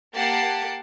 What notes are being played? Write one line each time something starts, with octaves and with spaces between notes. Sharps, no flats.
A#3 G4 F#5 A5 C7 D7